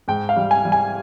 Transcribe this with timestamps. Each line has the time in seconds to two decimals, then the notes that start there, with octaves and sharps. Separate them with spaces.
0.08 G#2 G5
0.29 F5
0.37 G3
0.51 G#5
0.65 G3
0.72 G#5